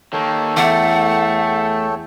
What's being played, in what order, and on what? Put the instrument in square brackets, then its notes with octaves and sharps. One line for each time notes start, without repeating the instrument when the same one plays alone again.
[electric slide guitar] D#3 A#3 [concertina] A4 C#5 G5
[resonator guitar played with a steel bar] E2 [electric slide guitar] A3 [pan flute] F#5